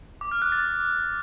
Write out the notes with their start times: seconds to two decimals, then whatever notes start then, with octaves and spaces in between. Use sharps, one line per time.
0.21 D6
0.31 F6
0.42 F#6
0.52 A6